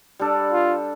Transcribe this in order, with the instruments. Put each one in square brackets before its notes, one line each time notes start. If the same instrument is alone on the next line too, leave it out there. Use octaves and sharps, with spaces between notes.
[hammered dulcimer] G3 D4 A4
[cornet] F4